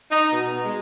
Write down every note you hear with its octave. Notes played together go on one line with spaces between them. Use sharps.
D#4
B2
G#3